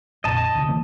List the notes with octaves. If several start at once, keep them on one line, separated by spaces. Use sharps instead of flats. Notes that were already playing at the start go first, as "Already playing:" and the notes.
A#1 F2 A#2 D#5 A5
D2 C#3
E3 A#3